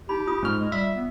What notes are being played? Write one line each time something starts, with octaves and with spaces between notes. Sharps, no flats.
D#4 G4 B5
F4 D#6
G#2 C#4 C#6 F6
G#3
G3 E5
B3